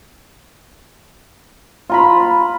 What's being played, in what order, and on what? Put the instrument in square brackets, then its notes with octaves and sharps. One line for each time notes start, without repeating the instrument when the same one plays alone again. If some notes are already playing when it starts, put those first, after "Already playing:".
[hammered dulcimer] F4 A#5 B5